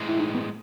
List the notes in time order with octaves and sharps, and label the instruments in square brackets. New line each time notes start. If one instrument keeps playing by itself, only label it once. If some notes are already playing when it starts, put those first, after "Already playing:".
Already playing: [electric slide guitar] A2 E3 G#3
[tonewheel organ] E4
D#4
B3